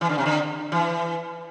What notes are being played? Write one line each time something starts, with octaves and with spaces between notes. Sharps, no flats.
E3
D3
C3
D3
E3